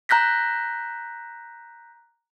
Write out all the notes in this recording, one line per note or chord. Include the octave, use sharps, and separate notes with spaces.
A#5 F#6 G6 A#6 B6